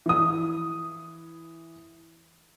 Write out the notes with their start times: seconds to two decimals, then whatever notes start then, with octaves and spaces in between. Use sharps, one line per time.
0.06 E3 D#6